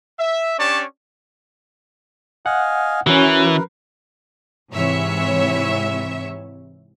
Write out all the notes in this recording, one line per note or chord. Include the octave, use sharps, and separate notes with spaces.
E5
C#4 D4 G4 C#5 D5 A5
D#5 F5 F#5 G#5
E3 C#4 F#4 A#4 B4
G#2 C3 E3 C#5 E5